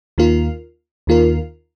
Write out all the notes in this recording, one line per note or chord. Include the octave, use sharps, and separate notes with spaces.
D#2 D#3 A#3 F4 A#4
D#2 D#3 A#3 F4 A#4